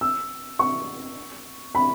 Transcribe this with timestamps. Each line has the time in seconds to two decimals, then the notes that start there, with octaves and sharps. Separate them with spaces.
0.01 E6
0.59 C#6
1.75 B5